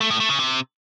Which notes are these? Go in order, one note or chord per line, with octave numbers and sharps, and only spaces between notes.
A3
A2
A3
C#3
C3